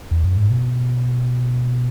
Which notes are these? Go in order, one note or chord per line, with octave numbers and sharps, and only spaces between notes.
E2
F#2
G#2
B2